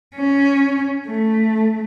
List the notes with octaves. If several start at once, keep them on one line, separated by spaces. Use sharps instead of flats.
C#4
A3